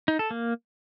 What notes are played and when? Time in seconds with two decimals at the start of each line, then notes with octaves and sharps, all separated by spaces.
0.08 D#4
0.19 A4
0.31 A#3